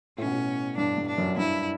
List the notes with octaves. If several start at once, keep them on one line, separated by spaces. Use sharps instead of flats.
A2 C#4
B2
A2
G2 D4
G2
D4
F#2
G2 E4